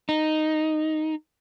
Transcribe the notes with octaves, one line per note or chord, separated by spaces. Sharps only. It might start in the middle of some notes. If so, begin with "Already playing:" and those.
D#4